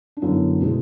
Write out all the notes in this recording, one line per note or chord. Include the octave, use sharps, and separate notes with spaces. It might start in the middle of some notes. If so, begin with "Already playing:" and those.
D4
F#2 D3 F#3 B3 E4
B2 G#3